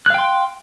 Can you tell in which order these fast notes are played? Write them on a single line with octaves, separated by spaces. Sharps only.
F#6 F5 G5 C6